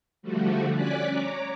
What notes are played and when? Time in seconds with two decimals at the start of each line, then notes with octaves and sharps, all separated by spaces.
0.22 D3 F3 G3 A3 F#4
0.74 C#4 D5 G#5 D6 F#6 B6
1.09 C#5 A#5 D6